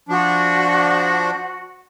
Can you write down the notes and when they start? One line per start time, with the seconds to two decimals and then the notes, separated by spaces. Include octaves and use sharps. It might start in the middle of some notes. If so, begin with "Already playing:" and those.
0.09 F3 D4 F#4